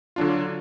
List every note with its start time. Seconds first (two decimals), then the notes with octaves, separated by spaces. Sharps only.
0.16 D3 F#3 D4 F4